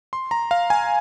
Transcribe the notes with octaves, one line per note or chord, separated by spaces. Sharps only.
C6
A#5
F5
G#5